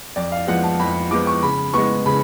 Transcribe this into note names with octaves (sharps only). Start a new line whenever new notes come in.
F2 D5
F5
F3 G#3 B3 F#5
A5
F2 B5
F3 G#3 B3 D6
C#6
C#3 B5
G#3 B3 C#6
C#3 B5